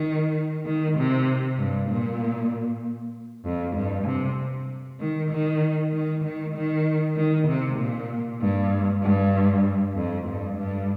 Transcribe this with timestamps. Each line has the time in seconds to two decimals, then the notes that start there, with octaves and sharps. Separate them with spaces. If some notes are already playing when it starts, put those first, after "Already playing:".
Already playing: D#3
0.65 D#3
0.97 C3
1.58 G2
1.90 A#2
3.45 F2
3.76 G2
4.07 C3
5.00 D#3
5.31 D#3
5.93 D#3
6.24 D#3
6.54 D#3
7.16 D#3
7.48 C3
7.79 A#2
8.41 G2
9.03 G2
9.96 F2
10.27 G2
10.58 G2